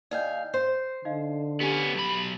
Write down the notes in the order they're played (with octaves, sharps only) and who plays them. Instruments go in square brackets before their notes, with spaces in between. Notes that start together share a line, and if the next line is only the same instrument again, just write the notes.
[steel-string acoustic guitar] D#2 F5 G#5 [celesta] D5 D#5 G6
[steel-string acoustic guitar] C5 [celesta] G6
[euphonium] D3 [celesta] D#4 D#5 F5
[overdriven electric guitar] B3 C#4 [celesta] G4
[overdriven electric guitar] B1 B5